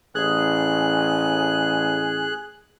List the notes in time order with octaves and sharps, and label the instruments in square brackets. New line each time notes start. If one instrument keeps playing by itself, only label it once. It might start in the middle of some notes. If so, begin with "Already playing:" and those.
[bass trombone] A1 [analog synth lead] G#4 [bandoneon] F#6